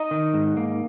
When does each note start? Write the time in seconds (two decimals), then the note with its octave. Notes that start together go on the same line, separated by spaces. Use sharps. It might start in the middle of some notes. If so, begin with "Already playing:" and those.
Already playing: D#4 D#5
0.11 D#3
0.34 G#2
0.57 A#3